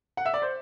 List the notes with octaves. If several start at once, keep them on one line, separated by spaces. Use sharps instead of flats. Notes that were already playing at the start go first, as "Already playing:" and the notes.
F#5
E5
D5
C5